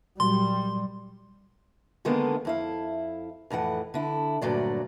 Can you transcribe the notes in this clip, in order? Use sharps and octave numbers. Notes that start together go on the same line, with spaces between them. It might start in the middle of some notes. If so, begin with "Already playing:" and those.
A#2 F#3 G3 F#4 C6
D3 D#3 G#3 A#3 B3
F2 E4 F5
F2 A2 E3 F#5
D3 E4
D2 G2 A#2 F#3 D5